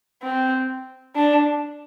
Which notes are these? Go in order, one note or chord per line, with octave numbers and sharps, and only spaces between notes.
C4
D4